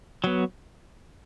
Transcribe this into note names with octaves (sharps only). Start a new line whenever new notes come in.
F#3 B3